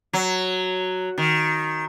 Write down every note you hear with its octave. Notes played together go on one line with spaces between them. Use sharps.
F#3
D#3